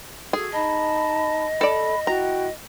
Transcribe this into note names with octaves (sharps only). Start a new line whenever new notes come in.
F#4 G#4 A4
D#4 D#5 A5 B5
A4 D5 B5
E4 F#4 G5 A#5